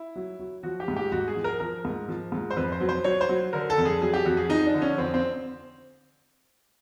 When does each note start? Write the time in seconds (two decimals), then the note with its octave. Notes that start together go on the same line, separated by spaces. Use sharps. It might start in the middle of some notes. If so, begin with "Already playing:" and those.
Already playing: E4
0.16 F#3
0.39 F#3
0.63 F3 F#4
0.80 G4
0.88 G#2
0.96 G4
1.12 G#2 F#4
1.28 G#4
1.36 F3
1.44 A#4
1.60 F3 A#4
1.85 G#2
2.08 F3
2.32 G#2
2.50 C5
2.57 F2 B4
2.72 C5
2.81 F#3
2.89 C5
3.04 F#3 C#5
3.21 C5
3.29 F#3
3.53 D3 A#4
3.70 A4
3.78 F2
3.85 G#4
4.01 F#3 G#4
4.13 G4
4.25 F2 F#4
4.37 G#4
4.49 F3 D#4
4.66 D4
4.74 D3
4.82 C#4
4.98 F2 C4
5.14 C4